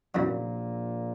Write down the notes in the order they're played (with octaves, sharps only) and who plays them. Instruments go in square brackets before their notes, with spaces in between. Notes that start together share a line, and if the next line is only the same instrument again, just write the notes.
[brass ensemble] A#1 A#2 [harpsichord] E2 C#3 F#3